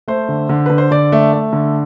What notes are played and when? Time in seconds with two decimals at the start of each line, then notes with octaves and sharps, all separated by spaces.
0.08 A3 C5
0.29 D3
0.49 D3
0.66 D3 B4
0.78 C5
0.91 D3 D5
1.12 A3
1.33 A3
1.53 D3